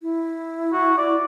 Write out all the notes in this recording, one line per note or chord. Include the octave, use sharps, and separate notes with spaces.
E4
F#4
D5